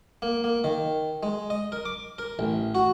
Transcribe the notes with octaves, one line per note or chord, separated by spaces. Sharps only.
A#3
A#3
D#3
G#3
D#5
A#4
D6
A#4
A1
F#4